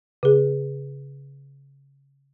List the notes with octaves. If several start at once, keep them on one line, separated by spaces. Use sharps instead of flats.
C#3 G#4